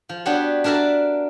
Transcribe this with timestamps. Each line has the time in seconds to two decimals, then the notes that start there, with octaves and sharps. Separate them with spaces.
0.09 F3
0.26 B3 D4 F#4 G4 C#5
0.64 D4 F#4 A#4 E5 A5